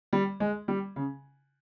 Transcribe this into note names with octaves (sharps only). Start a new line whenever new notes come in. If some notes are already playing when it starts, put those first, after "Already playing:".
G3
G#3
G3
C#3